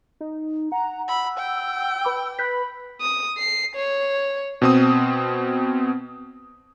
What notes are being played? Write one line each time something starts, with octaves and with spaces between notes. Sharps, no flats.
D#4
F#5 A#5
B5 E6
G5
B4 B5 D6
B4 B5 F#6 G6 B6
D#6
C7
C#5
B2 C4 D#6